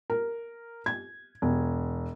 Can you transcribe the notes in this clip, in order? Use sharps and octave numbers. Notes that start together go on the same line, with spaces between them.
A#4
G#6
E1